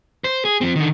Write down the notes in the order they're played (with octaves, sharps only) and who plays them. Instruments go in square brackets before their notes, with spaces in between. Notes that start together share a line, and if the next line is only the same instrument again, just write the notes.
[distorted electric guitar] C5
G#4
F3 C4
D3 D#3